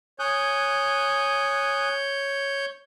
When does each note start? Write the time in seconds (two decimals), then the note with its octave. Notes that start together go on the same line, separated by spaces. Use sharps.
0.19 C#5 G#5 D#6 F#6 G6